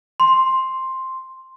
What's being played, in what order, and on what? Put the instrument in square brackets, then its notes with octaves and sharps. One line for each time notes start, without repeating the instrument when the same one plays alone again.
[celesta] C6